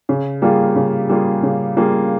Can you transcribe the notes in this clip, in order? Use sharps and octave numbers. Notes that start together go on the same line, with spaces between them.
C#3
G3 A#3 F4 G#4
C#3
G3 A#3 F4 G#4
C#3
G3 A#3 F4 G#4